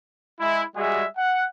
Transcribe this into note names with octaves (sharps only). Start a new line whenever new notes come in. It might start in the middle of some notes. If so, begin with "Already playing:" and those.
G#3 E4
G3 G#3 F#4 G#4 E5
F#5